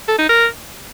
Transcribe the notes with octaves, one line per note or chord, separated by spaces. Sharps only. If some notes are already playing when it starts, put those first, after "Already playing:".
A4
D#4
A#4